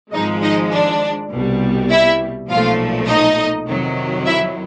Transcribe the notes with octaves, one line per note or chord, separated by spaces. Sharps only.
G#1 G#2 F3 G#3 D#4 D#5
D#4 D#5
D4 D5
C2 B2 G3
E4 E5
B1 A#2 F3 A3 F4 F5
D#4 D#5
F2 C3 D#3 F#3
E4 E5